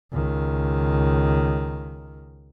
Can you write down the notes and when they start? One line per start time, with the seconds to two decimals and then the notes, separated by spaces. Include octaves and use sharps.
0.12 C#2 D#3